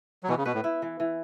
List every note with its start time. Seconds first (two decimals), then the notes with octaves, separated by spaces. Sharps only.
0.23 F#3
0.28 B2 E3 B3
0.37 C#3
0.45 B2 B4
0.54 A2
0.64 E4
0.82 E3
1.00 E3